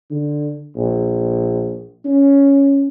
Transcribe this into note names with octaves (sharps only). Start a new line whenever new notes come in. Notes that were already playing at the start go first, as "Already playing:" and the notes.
D3
A#1
C#4